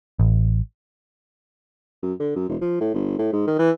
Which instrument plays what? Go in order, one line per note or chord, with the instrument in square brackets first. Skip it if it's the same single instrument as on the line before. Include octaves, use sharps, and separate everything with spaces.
[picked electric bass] A1
[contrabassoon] F#2
D3
F#2
E1
F3
A2
G1
A2
G#2
D#3
E3